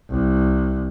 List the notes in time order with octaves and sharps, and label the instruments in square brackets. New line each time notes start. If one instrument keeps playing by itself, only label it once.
[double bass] C2